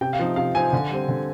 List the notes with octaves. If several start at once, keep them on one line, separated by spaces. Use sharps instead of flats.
C3 G5
F5
F3 C4 D#4
C3 F5
F3 C4 D#4 G#5
D3
G3 C4
D3